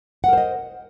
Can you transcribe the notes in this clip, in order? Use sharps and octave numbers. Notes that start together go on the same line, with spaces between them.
A#4 C5 D#5 F#5